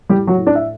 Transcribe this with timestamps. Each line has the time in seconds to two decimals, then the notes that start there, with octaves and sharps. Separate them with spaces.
0.10 A2 G3 G4
0.27 F#3 F#4
0.37 A2
0.47 D4 D5
0.55 E5